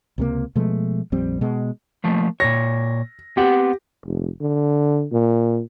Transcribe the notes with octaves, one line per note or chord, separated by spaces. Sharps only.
C#2 C3 A#3
B2 F3 G#3 A3
A#1 F2 G3 C4
B2 G#3
F3 A3 A#3
A#2 C#5 A#6
B3 C4 G4 F#5
F1
D3
A#2